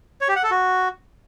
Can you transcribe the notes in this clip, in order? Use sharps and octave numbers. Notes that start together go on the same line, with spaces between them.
C#5
G4
F#5
A4
F#4